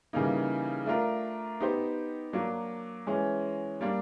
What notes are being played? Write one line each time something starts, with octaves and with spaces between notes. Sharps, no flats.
C#3 E3 G3 A#3 D#4
A3 D4 F4 A#4
B3 D#4 G4 C5
F#3 A#3 D4
E3 G#3 C#4
G3 A#3 D4